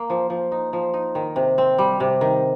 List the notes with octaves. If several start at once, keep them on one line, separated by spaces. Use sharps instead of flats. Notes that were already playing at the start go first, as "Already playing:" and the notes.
Already playing: A#3
F3
F3
D#4
F3
D#4
D#3
C3
C4
G3
C3
D#3